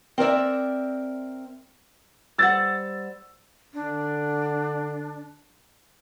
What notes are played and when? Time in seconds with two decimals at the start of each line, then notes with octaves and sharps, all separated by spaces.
0.18 C4 A#4 D5 E5
2.38 G3 C5 F#5 E6 A6
3.74 D3 D4